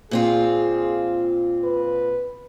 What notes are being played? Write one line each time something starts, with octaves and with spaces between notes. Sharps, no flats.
A#2 C4 F4 G#4
B4